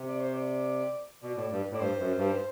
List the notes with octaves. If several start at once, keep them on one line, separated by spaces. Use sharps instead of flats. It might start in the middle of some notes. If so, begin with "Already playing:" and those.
Already playing: C3
D5
C5
D5
B2 D5
A2
G2
A2 D5
G2 C5
F#2
G2